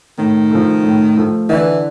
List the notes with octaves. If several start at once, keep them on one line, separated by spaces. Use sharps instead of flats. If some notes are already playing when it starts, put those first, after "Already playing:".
A2 D#3
F3 A3
A2
F3 A3
D3 E3